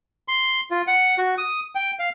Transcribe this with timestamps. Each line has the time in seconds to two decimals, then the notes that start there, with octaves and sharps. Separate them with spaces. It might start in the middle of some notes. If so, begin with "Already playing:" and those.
0.28 C6
0.71 F4
0.87 F#5
1.18 F#4
1.38 D#6
1.75 G5
1.99 F5